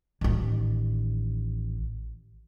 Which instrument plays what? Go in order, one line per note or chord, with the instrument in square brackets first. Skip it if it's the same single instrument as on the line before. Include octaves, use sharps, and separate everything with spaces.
[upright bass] A1 D#3